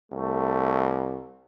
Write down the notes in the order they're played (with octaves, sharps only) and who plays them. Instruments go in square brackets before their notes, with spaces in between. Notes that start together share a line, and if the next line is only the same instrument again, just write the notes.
[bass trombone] C2 [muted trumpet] A3